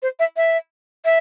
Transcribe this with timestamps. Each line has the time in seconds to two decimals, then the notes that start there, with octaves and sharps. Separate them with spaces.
0.02 C5
0.19 E5
0.37 E5
1.05 E5